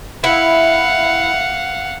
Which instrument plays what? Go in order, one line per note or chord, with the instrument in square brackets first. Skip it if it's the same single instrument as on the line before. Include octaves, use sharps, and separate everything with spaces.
[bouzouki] E4 [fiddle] F5 F#5